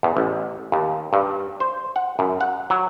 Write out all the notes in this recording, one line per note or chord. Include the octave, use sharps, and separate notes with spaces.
E2
A1
D#2
G2
C5
F#5
F#2
F#5
F#3